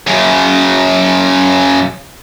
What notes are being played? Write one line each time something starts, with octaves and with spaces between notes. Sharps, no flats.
F#2 C#3